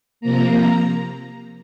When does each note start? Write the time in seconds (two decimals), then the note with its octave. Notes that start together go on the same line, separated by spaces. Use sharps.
0.21 C3 F3 A#3 A#5